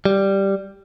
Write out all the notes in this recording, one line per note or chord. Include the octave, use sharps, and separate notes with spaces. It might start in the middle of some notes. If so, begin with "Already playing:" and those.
G3